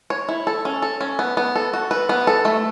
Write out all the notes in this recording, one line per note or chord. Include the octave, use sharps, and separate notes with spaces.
C#5
E4
A4
C#4
A4
C#4
B3
B3
A4
F#4
B4
B3
A4
A3